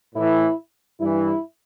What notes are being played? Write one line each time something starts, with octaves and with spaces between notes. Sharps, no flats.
A2 E3 E4
G2 E3 E4